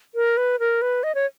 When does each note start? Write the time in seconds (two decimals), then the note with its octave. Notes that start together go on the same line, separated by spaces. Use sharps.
0.15 A#4
0.37 B4
0.59 A#4
0.82 B4
1.03 D#5
1.15 C#5